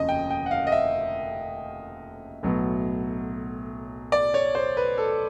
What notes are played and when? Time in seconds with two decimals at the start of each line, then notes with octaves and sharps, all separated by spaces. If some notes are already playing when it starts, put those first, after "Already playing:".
Already playing: F1 D#2 C#3 F3 D#5
0.09 G5
0.30 G5
0.46 F#5
0.51 F5
0.67 D#5
0.72 E5
2.43 B1 A2 F#3 B3
4.12 D5
4.34 C#5
4.55 C5
4.77 B4
4.98 A4